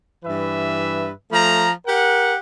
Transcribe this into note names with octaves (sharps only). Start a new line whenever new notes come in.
G2 E3 B4 E5
F3 A3 A#5
G4 A#4 F#5